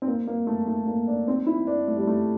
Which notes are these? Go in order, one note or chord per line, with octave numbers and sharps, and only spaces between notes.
C4
A#3
A#3
A3
A3
A#3
D4
C4
E4
D4
A3
G3
A3